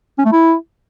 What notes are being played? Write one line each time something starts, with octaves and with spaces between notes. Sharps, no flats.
C#4
A3
E4